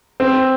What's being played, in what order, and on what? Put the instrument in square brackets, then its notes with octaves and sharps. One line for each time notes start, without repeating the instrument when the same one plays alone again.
[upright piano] C4